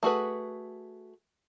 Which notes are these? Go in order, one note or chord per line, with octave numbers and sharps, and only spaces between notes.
A3 F#4 G#4 B4